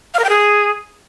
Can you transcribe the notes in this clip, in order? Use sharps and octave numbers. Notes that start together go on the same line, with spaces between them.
F5
A#4
G5
G#4